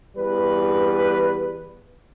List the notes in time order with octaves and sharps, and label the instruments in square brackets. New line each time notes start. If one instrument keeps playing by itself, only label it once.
[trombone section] E2 G3 B4